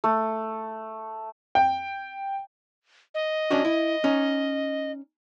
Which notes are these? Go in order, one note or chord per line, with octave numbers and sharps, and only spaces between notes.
A3
G5
D#5
C#4 D4 F#4
E4
C#4 D#4